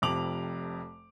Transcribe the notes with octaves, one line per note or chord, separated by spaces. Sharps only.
F1 F2 C3 D6 F7 F#7